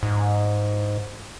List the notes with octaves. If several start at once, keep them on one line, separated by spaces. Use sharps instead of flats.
G#2